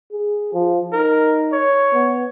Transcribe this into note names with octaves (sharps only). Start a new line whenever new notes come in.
G#4
F3
D#4 A#4
C#5
B3